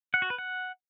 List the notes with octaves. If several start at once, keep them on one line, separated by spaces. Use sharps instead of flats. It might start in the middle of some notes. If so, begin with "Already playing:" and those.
F#5
F#4
B4
F#5